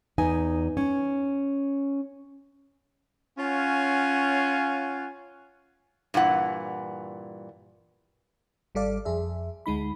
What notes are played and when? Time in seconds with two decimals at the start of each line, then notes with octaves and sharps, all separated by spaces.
0.18 E2 D#4 G#5
0.77 C#4
3.38 C#4 F4 C#5 F5 F#5 G#5
6.14 G2 A#2 E3 F#5
8.75 G#1 G3 A4 D5 F5
9.05 F2 G#4 E5
9.66 D2 G#3 D#4 B5